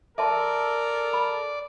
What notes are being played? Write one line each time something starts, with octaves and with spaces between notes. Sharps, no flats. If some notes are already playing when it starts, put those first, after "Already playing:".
A4 A#4 D5 E5 A5 C6
B5